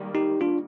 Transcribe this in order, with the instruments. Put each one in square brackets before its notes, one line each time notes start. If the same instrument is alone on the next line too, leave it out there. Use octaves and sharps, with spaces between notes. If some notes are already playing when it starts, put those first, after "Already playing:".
Already playing: [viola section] D#3 G3 A#3
[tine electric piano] D#4 G4
D4 F4